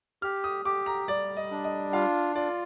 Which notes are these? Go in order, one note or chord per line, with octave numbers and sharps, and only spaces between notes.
G4 F6
D#6
G4 D6
A#5
G3 D5
D#5
D4
D#5
F4 F5
F4 D5